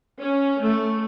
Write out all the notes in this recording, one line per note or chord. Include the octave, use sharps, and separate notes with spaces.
C#4
A3